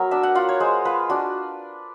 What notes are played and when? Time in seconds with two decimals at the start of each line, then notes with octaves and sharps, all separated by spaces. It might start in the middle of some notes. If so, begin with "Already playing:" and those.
Already playing: F#3 B3 A#4
0.11 D4 E5
0.23 F#5
0.35 F4 F#5
0.49 C#5
0.60 G#3 C5
0.85 F4 B4
1.10 D4 F#4